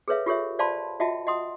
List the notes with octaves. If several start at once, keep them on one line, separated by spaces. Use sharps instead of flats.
G#4 A4 B4 C#5 E5 F5
F4 G4 A4 C#5 E5
C5 D5 F5 A5 B5 C6
F4 F#4 D#5 E5 G5 A5
D#5 F#5 C6 D#6